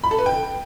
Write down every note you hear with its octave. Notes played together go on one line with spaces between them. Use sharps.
B5
A4
B4
G5